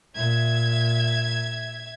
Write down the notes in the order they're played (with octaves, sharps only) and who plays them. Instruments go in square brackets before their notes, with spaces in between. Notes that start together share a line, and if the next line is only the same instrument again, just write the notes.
[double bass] A#2 [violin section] E5 G#6